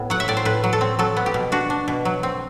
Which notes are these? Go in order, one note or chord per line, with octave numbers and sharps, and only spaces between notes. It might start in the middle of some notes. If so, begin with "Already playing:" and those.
Already playing: A2 B3
F#3 F#5
E5
A2 D5
C5
A2 B4
F#3
A4
C4
F#3 A4
B3
G4
B2
D4 F#4
D4
B2
F#3
C4